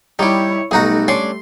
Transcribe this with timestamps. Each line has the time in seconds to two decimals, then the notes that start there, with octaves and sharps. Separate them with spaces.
0.19 G3 D#4 E4 G4 C#5
0.71 B1 G3 A3 D#4 F#4 G#4 A#5
1.08 C#4 D4 D5 C6